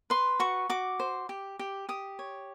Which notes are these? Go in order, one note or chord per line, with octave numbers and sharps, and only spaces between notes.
B4 C6
F#4 C#6
F#4 D6
C5
G4
G4
G4 D#6
C#5